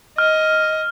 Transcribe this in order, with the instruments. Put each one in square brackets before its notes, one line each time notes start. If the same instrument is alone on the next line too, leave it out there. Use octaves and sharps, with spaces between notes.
[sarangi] D#5 [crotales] F6